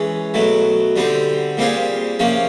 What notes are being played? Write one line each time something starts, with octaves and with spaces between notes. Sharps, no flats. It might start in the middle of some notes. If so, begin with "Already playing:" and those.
Already playing: E3 G#3 C#4
B2 F#3 A3
D3 G3 C4 D#4
A#2 G3 C4 F4 G#4
C3 F3 A#3 C#4